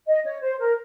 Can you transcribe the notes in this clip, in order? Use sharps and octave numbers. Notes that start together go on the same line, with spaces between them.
D#5
C#5
C5
A#4